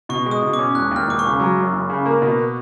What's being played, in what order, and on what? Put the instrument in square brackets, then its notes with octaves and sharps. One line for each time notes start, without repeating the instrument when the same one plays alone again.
[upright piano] B2 [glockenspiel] C#6
[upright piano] G#3
[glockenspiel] D#6
[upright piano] B2
[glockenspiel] D6
[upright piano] C#4
[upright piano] E1 [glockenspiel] F#6
[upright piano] D#2 [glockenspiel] F6
[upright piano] E1 [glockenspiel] D6
[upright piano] C#3 [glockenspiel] C#6
[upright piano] F#3
F#2
F#1
C#3
A#3
B2